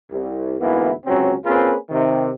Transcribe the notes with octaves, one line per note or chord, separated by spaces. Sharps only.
C2
D2 G#2 E3 A#3 B3 E4
C#2 C3 F#3 C4 C#4
A#3 C4 C#4 F4 G#4 B4
C3 D#3